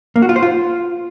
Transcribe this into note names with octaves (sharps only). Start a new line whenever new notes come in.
A#3
F#4
F4
C5
F4